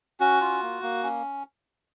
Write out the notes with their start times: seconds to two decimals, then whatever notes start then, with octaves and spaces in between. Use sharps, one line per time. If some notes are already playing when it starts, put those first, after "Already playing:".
0.20 C#4 F#4
0.41 F4
0.63 A#3
0.83 A#3
1.03 C#4